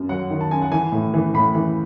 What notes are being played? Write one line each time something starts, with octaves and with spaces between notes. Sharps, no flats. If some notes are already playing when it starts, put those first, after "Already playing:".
Already playing: F#2
F#3 F#5
D#3
A5
F#2 G#5
F#5
E3 G#5
A2
E3
A2 B5
E3